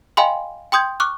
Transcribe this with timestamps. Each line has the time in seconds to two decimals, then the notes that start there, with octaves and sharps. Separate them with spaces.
0.17 D#5 F5 G5 G#5 B5 C6
0.72 G5 C6 D#6 G6 G#6
1.00 C#6 D6 F6 F#6